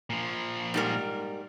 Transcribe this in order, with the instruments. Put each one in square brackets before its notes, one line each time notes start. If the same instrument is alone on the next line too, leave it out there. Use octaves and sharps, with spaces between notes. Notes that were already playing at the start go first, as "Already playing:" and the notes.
[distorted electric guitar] A#2 F3
[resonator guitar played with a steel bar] G#2 G3 A#4